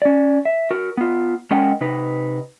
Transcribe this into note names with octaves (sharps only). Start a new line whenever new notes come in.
C#4 D5
E5
F#4 A#4
B3 F4
G#3 C#4 A#4 D#5 F#5 G5
C3 D#4 B4